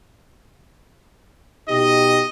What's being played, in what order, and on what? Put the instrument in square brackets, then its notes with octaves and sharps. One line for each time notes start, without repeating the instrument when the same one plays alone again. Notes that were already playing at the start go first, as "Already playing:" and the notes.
[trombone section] B2 D#4 G4 [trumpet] D#5